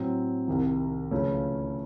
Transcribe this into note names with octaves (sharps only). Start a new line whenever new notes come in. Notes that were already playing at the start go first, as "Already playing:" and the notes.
Already playing: A2 F#3 C4
C2 C3 D#3
C#2 C#3 F3 A3 C#4